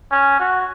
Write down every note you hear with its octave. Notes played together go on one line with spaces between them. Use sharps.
C#4
F#4